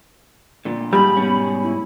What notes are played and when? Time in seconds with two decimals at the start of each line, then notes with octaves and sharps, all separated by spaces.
0.65 A#2 D3
0.93 G#2 G3 B5
1.17 B2 C#4
1.62 E4